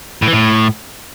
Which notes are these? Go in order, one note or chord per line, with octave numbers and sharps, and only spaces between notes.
A2
E3
A2